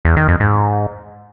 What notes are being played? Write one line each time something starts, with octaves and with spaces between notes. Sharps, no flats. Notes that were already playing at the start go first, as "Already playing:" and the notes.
E2
D#3
F2
G#2